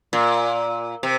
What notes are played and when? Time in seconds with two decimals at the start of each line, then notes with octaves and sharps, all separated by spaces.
0.13 A#2
1.03 C3